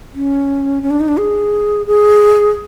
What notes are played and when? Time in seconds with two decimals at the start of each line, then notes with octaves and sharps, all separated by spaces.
0.14 C#4
0.83 C#4
0.91 D4
1.00 D#4
1.08 D4
1.17 G#4
1.87 G#4